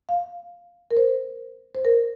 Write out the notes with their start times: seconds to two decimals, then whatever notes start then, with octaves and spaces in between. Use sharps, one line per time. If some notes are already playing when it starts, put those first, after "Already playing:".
0.09 F5
0.91 A#4
0.97 C5
1.75 C5
1.85 A#4